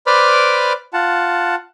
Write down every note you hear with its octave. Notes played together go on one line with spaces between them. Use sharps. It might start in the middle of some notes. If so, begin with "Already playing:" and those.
B4 C5 D5 B5 D6 F6
F4 F#5 A5